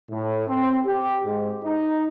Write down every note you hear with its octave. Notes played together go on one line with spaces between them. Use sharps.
A2
C4
G4
G#2
D#4